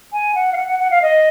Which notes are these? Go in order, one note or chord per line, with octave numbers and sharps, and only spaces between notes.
G#5
F#5
F5
F#5
F#5
F#5
F5
D#5